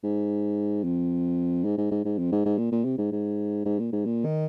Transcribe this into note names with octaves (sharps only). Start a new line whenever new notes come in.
G#2
F2
G#2
G#2
G#2
G#2
F2
G#2
G#2
A#2
A#2
C3
G#2
G#2
G#2
A#2
G#2
A#2
D#3